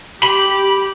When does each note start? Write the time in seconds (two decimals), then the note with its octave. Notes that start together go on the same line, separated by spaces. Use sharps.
0.23 G4 B5